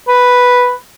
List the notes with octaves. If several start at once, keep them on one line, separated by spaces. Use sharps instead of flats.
B4